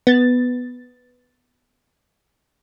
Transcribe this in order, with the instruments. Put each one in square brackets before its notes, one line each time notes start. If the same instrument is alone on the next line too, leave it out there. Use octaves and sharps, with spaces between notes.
[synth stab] B3 A6